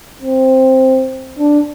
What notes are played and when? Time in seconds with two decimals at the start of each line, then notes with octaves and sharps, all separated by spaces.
0.22 C4
1.39 D4